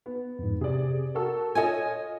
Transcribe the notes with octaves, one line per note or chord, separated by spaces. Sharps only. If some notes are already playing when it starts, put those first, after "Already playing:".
B3
F2 G#2
C3 G#4 D5
F#4 A4 A#4
F4 A4 C#5 D#5 G#5 G#6